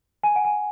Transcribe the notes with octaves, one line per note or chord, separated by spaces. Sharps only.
G#5
F#5
G#5